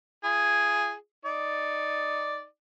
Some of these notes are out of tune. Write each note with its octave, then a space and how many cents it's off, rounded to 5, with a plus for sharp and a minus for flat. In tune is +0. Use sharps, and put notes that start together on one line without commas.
F4 -45 G#4 +0
D#4 +0 D5 +0